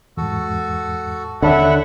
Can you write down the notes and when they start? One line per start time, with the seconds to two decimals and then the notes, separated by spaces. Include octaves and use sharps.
0.17 E2 G#2 F#4 A4
1.42 D#2 D3 E4 C#5 E5 F#5 A5